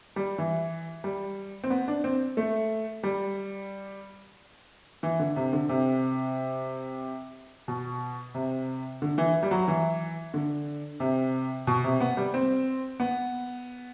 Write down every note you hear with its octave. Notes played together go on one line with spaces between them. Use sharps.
G3
E3
G3
C4
B3
D4
C4
A3
G3
E3
D3
C3
D3
C3
B2
C3
D3
E3
G3
F#3
E3
D3
C3
B2
C3
B3
G3
C4
B3